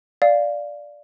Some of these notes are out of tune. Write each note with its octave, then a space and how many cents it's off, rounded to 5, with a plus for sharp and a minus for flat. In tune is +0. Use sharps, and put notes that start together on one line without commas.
D5 +0 F5 +0